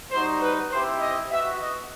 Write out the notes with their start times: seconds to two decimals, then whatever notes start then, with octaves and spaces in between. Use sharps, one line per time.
0.11 G3 D#4 F#4 C5
0.41 B4
0.70 C4 E4 G4 C5
1.00 D#5
1.29 B3 F#4 E5
1.59 D#5